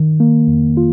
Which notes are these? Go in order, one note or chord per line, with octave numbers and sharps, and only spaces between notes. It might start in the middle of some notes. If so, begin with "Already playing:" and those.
Already playing: D#3
A#3
F2
F4